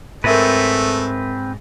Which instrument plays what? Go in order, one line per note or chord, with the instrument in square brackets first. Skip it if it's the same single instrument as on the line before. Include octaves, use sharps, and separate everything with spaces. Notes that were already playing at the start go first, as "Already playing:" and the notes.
[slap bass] G#2 [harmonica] A3 [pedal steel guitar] C4 B4 [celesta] A#4 E5 D#7